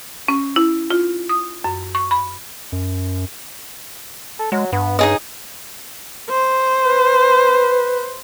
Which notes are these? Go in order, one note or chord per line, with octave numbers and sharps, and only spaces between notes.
C#4
E4
F4
D#6
F#2
C#6
B5
F#2
A4
F#3 G#3
G2 B3
C#3 D#4 G#4 D#5
C5
B4